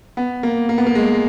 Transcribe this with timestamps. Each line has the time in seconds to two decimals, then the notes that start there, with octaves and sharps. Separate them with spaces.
0.17 B3
0.43 A#3
0.69 A#3
0.78 B3
0.87 A#3
0.95 G#3